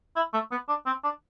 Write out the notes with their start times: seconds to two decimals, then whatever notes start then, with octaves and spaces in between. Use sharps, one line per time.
0.16 E4
0.34 A3
0.51 B3
0.69 D4
0.86 C4
1.04 D4